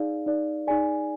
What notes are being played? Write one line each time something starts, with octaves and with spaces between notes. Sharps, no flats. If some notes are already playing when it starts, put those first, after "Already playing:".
Already playing: D#4 G#4 D5 F5
D#4 G#4 D5
D#4 G#4 D5 G#5